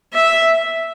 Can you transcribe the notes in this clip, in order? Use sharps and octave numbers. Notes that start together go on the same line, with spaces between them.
E5